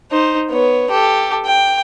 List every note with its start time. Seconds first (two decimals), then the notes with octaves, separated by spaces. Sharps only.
0.11 D#4 C5
0.50 B3 C#5
0.91 G4 A4
1.46 G5